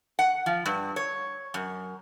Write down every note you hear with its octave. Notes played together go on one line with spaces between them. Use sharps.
F#5
F3
G2
C#5
F#2